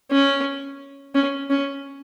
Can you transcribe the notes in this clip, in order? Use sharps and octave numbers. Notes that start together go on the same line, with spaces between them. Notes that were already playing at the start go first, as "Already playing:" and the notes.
C#4
C#4
C#4